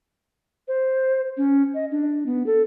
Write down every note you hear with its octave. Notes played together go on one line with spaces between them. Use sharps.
C5
C#4
D#5
D4
B3
A4